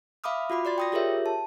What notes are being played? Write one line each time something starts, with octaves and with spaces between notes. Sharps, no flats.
E5 F5 B5 D6 D#6 F6
F4 F#4 B5 D6
F#4 D5 C6 A6
G5 D#6 A#6
F4 G4 G#4 A#4 C#5 E5
A5